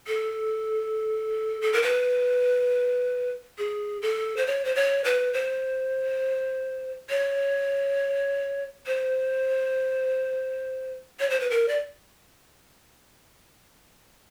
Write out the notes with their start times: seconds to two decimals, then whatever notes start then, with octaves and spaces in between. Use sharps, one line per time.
0.07 A4
1.62 A4
1.73 A#4
1.82 B4
3.58 G#4
4.02 A4
4.37 C5
4.47 C#5
4.65 C5
4.75 C#5
5.04 B4
5.34 C5
7.09 C#5
8.86 C5
11.20 C#5
11.30 C5
11.40 B4
11.50 A#4
11.68 D5